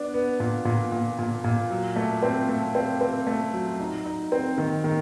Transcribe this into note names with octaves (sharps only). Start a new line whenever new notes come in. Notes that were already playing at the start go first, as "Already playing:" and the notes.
Already playing: B3 D4
B3
A#2
A#2
A#2
A#2
A#2
F#3
A3
C4
A3
C4
C4
A3
F#3
D#4
D#4
C4
D#3
D#3